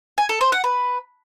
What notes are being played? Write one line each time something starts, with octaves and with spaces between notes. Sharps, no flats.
G#5
A4
C5
F#5
B4